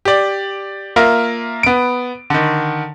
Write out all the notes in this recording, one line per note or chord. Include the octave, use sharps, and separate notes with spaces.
G4 D5
A#3 F4 A#4 E5
B3 D7
D3 D#3